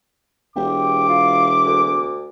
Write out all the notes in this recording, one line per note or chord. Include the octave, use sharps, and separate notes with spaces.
E1 G4 D6
F4
D2